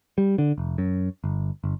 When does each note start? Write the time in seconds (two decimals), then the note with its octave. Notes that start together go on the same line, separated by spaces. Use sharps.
0.18 G3
0.38 D3
0.58 F1
0.78 F#2
1.24 G1
1.64 G1